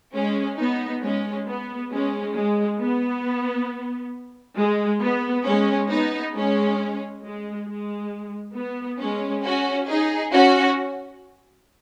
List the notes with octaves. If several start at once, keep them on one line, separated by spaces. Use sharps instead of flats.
G#3 C#4
B3 D#4
G#3 C#4
B3
G#3 C#4
G#3
B3
G#3
B3
G#3 C#4
B3 D#4
G#3 C#4
G#3
G#3
B3
G#3 C#4
C#4 F#4
D#4 G#4
C#4 F#4